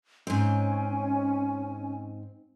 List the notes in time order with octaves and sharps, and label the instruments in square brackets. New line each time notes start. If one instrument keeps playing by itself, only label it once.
[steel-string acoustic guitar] G#2 C4 [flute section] C#4 G#5